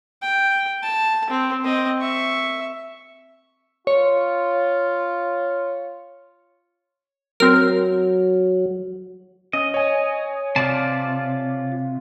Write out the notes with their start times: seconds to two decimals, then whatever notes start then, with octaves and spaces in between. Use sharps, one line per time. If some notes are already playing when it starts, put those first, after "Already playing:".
0.22 G5
0.82 A5
1.30 C4
1.64 C4 D#5
2.01 E5 C#6
3.87 F4 C#5
7.40 F#3 C4 A#4 F6
9.53 C#4 D#5
9.74 C#5 G#5
10.56 C3 F4 D5 A5